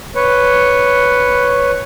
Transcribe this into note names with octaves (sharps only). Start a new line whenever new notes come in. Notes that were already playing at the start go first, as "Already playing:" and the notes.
B4 C#5